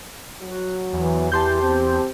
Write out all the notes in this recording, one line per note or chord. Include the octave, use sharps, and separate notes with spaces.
F#3 F#4
E2 E3
E3 G4 A5 C6 G6
C4